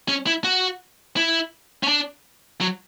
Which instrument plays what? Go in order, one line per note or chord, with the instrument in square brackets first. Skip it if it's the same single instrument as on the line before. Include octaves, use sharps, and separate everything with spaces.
[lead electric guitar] C#4
E4
F#4
E4
C#4
D4
F#3